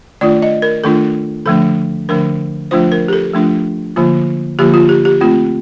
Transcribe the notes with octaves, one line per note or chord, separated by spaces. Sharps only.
D#3 A3 D4 F4 D5
D#5
A#4
D#3 A3 D4 F4 A4
D3 F3 A3 D4 A4
D3 F3 A3 D4 A#4
F3 A3 D4 F4 C5
A#4
G4
A4
F3 A3 D4 F4
D3 F3 A#3 F4
D3 F3 A#3 F4 G4
F4
G4
G4
A3 C4 F4